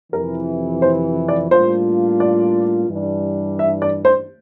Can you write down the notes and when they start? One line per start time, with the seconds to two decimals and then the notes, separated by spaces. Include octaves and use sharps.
0.13 F2 C3 E3 A#4
0.82 C5
1.29 D5
1.51 A2 G3 A#3 D4 F4 C5
2.20 D5
2.89 G2 E3 G3 D4
3.59 E5
3.82 D5
4.05 C5